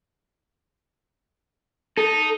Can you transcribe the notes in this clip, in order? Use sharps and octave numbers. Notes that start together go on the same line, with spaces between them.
D#4 A4